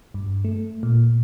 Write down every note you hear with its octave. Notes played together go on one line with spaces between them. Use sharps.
G2
A3
A#2